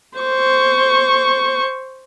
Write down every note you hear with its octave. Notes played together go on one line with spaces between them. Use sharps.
C5 C#6